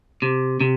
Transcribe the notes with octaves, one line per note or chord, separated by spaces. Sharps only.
C3
C3